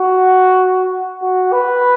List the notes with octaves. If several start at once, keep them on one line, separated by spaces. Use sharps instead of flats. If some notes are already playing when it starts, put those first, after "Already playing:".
Already playing: F#4
F#4
B4